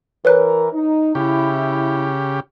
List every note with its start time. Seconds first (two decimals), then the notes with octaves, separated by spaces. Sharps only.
0.25 E3 A#4 B4 C#5 F#6
0.73 D#4
1.15 C#3 E4 G4